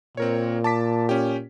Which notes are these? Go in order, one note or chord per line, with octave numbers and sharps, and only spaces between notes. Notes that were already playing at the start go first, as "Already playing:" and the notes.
A#2 C4 A#4 C#5
A5 D6 B6
C#4 G4